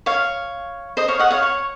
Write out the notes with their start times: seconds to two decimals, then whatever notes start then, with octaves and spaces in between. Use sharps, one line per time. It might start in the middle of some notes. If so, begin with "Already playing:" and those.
0.06 C#5 F5
0.97 C5 D#5
1.08 C#5 F5
1.19 D#5 F#5
1.30 C#5 F5
1.43 C#5